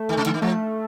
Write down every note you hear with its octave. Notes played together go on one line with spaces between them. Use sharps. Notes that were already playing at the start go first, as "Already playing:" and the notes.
Already playing: A3
D#3
C3
D3
D#3
F3 A3